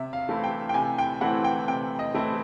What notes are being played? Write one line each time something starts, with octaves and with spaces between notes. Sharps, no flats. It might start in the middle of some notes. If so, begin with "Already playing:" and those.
Already playing: C3 E5
F5
E3 A3 C4 E4
G5
G5
C3 G#5
G5
E3 A3 C4 E4 F#5
G5
C3 G5
D#5
E3 A3 C4 E4